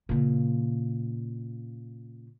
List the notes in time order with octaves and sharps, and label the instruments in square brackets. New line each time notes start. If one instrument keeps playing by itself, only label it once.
[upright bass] A#2 C#3